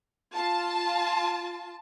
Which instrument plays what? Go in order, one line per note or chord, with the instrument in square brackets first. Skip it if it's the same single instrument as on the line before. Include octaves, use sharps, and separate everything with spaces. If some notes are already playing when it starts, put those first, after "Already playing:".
[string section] F4 A5